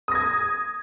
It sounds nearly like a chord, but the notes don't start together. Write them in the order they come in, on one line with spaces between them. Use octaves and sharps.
D#6 A#6 G#6